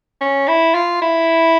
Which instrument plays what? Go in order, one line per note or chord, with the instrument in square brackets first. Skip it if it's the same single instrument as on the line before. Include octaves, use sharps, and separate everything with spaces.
[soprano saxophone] C#4
E4
F4
E4